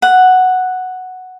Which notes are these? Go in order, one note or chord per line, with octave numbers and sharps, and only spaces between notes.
F#5